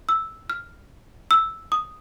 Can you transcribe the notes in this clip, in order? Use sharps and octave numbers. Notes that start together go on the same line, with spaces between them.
E6
F6
E6
D#6